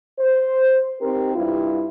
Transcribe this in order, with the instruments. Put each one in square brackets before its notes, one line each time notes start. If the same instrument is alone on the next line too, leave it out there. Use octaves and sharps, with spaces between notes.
[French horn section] C5
C4 D#4 G4 A#4
G2 E4 F4